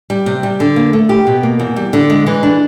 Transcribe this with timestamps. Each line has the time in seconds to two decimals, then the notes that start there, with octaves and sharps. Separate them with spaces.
0.10 G3
0.26 C3
0.43 G3
0.60 D3
0.76 A#3
0.93 A3
1.09 G4
1.27 B2
1.43 A#3
1.60 E2
1.76 G3
1.93 D3
2.10 G#3
2.27 E3
2.43 D4